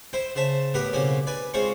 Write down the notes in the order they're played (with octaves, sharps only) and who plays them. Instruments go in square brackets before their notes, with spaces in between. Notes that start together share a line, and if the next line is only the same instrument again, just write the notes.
[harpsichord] E4 C5 G5
C#3 C5 E5 A5
A2 B3 G4 A#4 B4
B1 C#3 A#3 C4 C#4 G4
B4 D5 G#5
G#3 C4 F4 C5 C#5 C#6